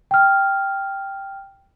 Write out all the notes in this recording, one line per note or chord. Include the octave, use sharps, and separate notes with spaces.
G5 F6